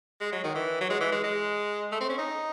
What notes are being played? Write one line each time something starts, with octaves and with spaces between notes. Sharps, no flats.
G#3
F#3
D#3
E3
F#3
G#3
E3
G#3
G#3
A3
C4
C#4
D#4